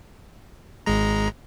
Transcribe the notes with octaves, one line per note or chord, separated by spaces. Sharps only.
G#1 G#3 A#5